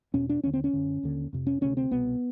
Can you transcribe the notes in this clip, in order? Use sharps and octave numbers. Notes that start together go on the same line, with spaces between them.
E2 B2 C#4
D4
D#2 D3 C#4
C4
C#4
F#2 D3
D#2 D3
F2 C3
C#4
D2 C3 C#4
C4
C2 B2 B3